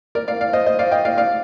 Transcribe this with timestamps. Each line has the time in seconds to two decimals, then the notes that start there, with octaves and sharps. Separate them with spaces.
0.15 A#4 D5
0.28 D5 F5
0.41 D5 F5
0.53 C5 D#5
0.66 C5 D#5
0.79 D5 F5
0.91 D#5 G5
1.05 D5 F5
1.18 D5 F5